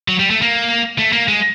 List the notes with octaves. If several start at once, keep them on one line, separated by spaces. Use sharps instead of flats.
F#3
G3
A3
A#3
A3
A#3
G#3